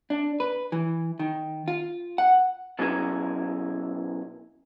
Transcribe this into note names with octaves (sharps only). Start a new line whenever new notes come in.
D4
B4
E3
D#3
F4
F#5
B2 F#3 C#4 E4 G#4 A#4